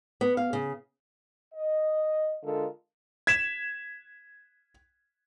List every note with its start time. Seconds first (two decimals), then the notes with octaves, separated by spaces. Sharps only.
0.21 B3
0.37 F5
0.53 C#3
1.54 D#5
2.43 D3 G#3 F4 A4 A#4
3.27 G#6 B6 E7